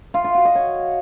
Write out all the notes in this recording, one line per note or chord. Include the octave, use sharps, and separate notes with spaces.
F4
F4
F#4
D#5
C#5